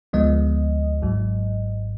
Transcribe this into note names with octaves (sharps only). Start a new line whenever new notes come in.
D2 D3 F3 G#3 B3 D#5
G#1 G#2 F#3